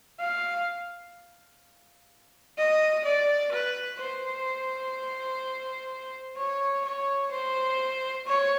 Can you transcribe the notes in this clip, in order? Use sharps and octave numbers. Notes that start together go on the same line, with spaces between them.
F5
D#5
D5
B4
C5
C#5
C#5
C5
C#5